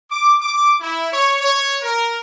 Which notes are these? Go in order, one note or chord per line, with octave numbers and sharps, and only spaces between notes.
D6
D6
E4
C#5
C#5
A#4